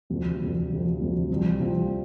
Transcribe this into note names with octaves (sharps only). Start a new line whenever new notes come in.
D2 C3 F3
D2 C3 F3
D2 C3 F3
D2 C3 F3
C2 C3 F3 C4 F4
C2 C3 F3 C4 F4